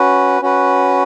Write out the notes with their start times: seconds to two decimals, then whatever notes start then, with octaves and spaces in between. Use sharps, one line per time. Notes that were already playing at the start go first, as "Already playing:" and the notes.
Already playing: C#4 F#4 B4
0.42 C#4 F#4 B4